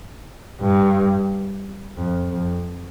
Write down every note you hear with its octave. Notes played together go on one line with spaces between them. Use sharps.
G2
F2
F2